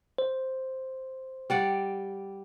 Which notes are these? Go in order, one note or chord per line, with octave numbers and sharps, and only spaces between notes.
C5
G3 D5 F#5